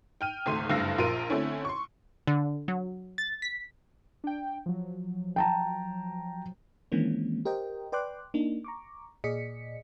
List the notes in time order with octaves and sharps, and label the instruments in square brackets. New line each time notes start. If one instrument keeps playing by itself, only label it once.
[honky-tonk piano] G5 F6 D#7
G#1 C#2 A3 C6 D#7
F#1 G2 A3 F5 E6 A#6
A#1 F4 A#4 C6 D7 D#7
D3 A3 C4 C#4 E4
C6 C#6
[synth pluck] D3
F#3
A6
B6
[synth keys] D4 G5
F3 F#3
[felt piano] G5 A5 A#5
[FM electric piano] D#3 E3 G#3 A#3 C4 C#4
G4 A#4 C5 D#5 G5
B4 D5 G5 C6 D6 F#6
A#3 D4 D#4
A#5 C#6 D6
A#2 G#4 D5 D#5 B6 C#7